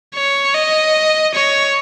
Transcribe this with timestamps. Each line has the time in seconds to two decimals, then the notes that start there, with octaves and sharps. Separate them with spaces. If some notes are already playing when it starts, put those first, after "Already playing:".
0.15 C#5
0.54 D#5
1.34 C#5